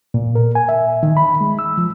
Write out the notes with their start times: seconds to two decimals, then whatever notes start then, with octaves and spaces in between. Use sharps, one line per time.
0.14 A#2
0.35 A#4
0.55 G#5
0.69 E5
1.03 D#3
1.17 B5
1.41 G#3
1.59 E6
1.78 F3